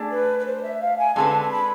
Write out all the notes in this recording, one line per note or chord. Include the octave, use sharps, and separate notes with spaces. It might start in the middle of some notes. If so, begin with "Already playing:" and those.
Already playing: A3 D4 G#4 D5
B4
B4
C5
E5
F5
G#5
D3 G#3 C4 G#4 B4 A5
A5
B5